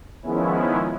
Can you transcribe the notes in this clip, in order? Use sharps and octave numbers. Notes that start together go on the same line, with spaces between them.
D#3 F3 G#3 B3 C#4 E4